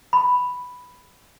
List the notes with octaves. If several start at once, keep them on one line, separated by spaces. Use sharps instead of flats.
B5